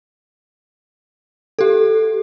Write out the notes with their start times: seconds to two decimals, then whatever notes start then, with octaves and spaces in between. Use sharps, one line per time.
1.59 G4 A4